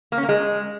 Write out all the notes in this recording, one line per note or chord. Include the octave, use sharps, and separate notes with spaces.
A#3
C#4
A#3
G#3